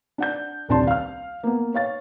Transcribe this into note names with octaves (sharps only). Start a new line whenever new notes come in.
D4 F#5 G6
D#1 C2 D4 A5 C6
F5 F6
A#3 B3
C#5 F5 A6